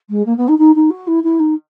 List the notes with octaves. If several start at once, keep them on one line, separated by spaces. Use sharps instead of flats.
G#3
A#3
B3
D#4
D#4
D#4
F#4
E4
E4
D#4